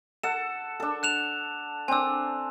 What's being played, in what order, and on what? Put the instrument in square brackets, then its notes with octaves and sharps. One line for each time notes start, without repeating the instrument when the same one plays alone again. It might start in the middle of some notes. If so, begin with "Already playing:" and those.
[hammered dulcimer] A4 F#5 [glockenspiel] E7
[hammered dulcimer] D4 A4
[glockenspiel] F#6 E7 F7
[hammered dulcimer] C4 D4 [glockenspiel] G#5 E6